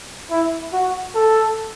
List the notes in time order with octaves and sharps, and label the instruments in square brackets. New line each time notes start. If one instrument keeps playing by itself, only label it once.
[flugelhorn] E4
F#4
A4